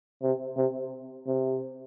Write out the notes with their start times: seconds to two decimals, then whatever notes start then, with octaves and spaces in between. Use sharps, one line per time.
0.22 C3
0.57 C3
1.27 C3